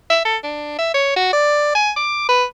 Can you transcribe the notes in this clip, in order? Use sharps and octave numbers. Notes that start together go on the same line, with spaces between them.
E5
A4
D4
E5
C#5
F#4
D5
G#5
D6
B4